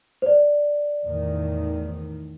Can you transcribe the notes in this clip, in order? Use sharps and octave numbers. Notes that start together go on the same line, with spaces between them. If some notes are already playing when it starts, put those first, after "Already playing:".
C5 D5
E2 A2 D#3